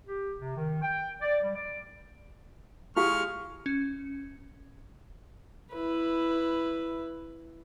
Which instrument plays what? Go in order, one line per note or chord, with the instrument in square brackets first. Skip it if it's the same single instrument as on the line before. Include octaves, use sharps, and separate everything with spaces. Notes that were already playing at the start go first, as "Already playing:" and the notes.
[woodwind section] G4
C3
D#3
G5
D5
G3
D5
[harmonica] G#3 C#6 F6 [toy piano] E4 G4 F5
[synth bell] C#4
[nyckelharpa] E4 B4